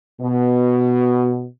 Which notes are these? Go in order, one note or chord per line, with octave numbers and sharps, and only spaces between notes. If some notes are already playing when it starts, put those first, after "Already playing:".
B2